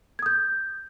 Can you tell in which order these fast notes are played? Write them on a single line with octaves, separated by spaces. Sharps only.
G#6 D#6 G6